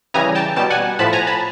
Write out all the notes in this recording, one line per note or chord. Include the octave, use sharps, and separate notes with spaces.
C#3 E3 G3 G#5 A#5
G5 A5
B2 G3 G5 A5
F#5 G#5
A2 F3 A5 B5
G#5 A#5
A5 B5